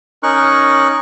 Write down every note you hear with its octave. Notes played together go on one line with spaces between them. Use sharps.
C#4 D#4 A#4 C#6 F#6